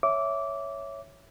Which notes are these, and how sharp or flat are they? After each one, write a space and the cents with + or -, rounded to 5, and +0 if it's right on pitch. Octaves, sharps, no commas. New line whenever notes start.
C#5 +0 E5 +0 D6 -15